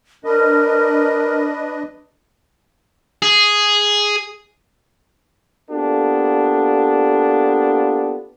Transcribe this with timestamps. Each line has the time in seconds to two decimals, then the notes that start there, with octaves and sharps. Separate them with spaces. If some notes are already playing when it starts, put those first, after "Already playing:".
0.24 D4 A#4 B4 D#5
3.22 G#4
5.70 A#3 B3 D4 F4 G4 A4